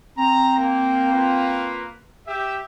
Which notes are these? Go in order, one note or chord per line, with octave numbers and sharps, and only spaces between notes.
C4 A#5
A#3
A#3 F4 B4
G4 E5